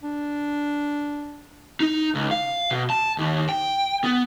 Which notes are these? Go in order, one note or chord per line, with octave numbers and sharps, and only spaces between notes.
D4
D#4
C#2
F5
B2
A5
D#2
G5
B3